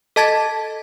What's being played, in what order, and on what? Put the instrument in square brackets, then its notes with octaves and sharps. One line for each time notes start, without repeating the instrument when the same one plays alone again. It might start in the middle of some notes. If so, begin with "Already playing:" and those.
[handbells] A4 D#5 A5 G#6 A6 B6